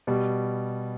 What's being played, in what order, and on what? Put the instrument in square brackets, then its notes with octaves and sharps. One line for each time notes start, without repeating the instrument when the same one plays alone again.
[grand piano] B2 G3